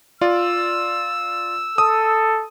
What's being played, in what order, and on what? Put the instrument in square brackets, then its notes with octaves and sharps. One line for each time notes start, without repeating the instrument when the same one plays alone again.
[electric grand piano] F4 D5 [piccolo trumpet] E6
[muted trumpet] A4 [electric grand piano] D#6